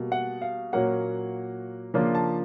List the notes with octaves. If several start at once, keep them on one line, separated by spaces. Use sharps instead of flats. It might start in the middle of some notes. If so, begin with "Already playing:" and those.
Already playing: B2 G3 A#3
F#5
F5
A#2 F#3 A#3 C#4 F#5
C#3 F3 A#3 D4 F4
A5